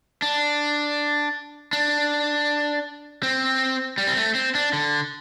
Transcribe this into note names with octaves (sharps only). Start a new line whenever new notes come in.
D4
D4
C4
G3
C4
A3
C4
D4
D3